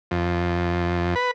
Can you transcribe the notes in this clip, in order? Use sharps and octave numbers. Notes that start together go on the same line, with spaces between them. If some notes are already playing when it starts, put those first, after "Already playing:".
F2
B4